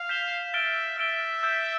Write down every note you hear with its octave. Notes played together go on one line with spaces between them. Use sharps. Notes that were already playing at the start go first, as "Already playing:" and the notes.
Already playing: F5
G6 B6 E7 G7
E5 F6 A6 D7 G7
E5 F6 A6 D7 G7
E6 G6 B6